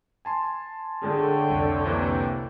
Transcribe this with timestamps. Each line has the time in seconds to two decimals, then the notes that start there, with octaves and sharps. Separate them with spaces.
0.25 G#5 A5 C6
1.04 D3 A3 G#4 C#5 G5
1.50 C2 F2
1.85 C3 E3 A#3